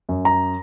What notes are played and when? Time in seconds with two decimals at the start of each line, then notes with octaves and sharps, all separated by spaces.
0.09 F#2
0.25 A#5